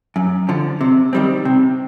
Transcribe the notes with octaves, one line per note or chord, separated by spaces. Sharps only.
F#2
D3 F3
C3
D#3 G3 C4
C3